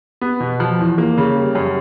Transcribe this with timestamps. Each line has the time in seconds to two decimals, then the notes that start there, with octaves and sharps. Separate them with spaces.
0.21 B3
0.40 B2
0.60 F3
0.79 E2
0.98 A#3
1.17 C#3
1.36 G3
1.55 F#2